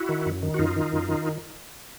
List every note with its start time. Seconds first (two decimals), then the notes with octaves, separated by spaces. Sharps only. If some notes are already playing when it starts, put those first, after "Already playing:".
Already playing: E4 F#4
0.09 D#3
0.26 F#2
0.43 D#3
0.54 F#4
0.59 F#2 D#4 F4
0.76 D#3
0.93 F#2
1.09 D#3